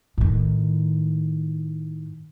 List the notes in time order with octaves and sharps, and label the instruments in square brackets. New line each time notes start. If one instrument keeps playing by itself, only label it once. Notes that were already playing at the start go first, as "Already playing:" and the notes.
[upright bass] A2 D#3